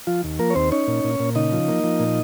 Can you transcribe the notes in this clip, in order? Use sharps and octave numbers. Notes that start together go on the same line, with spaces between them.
F3 F4
D#2
F3 A#3 A#4
C#5
D#2 C4 C5
C#4 D#4 C#5
A#2
A#2
A#2
C#3 D#4 D#5
F3
A#3
F3
A#2